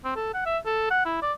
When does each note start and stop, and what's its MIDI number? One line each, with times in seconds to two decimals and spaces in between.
0.04 0.12 60
0.16 0.33 69
0.34 0.46 78
0.46 0.58 76
0.66 0.89 69
0.90 1.05 78
1.05 1.22 64
1.22 1.33 74